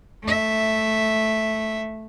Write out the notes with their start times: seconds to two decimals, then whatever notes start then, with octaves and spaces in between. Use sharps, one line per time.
0.23 A3 E5